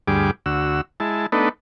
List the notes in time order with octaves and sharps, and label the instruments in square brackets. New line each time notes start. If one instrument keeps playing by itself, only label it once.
[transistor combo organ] D2 G2 G3 G#4 D6
D2 F#4 E6
G#3 E4 A5
A3 B3 D4 D#4 A4 B4